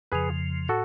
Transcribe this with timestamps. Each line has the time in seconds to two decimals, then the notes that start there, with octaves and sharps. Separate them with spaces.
0.12 F2 C#3 F3 G#4 B4
0.68 A2 F#4 A4